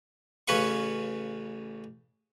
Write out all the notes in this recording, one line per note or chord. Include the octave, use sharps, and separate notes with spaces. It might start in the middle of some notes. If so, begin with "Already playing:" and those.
A1 C#3 C#4 B4 F5 C#6